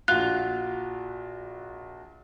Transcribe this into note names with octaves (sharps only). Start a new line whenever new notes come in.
A#1 F4 F#4 F#6 F7